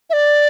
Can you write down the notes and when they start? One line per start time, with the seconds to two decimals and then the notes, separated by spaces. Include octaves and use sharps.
0.10 E5
0.13 D5